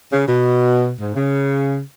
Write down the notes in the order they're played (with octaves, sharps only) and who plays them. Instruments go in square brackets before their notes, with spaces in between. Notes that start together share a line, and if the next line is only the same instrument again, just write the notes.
[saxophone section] C#3
B2
G#2
C#3